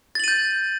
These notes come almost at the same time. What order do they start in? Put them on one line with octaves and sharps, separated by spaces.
A6 F#7 D#7 G6